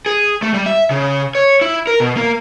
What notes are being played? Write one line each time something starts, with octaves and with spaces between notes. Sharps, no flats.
G#4
A3
G3
E5
C#3
C#5
E4
A#4
B2
A#3